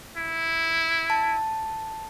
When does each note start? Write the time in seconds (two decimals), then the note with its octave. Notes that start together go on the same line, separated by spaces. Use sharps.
0.17 E4
1.10 A5